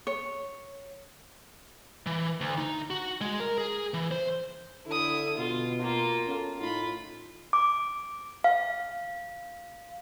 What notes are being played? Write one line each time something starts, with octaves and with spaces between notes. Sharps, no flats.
C#5
E3
D2
D#4
F#4
G#3
A#4
G#4
E3
C5
D3 E4 A4 D#6
B2 F4
A#3 F4
C#4 A4
A2 D#4 F4 B5
D6
F5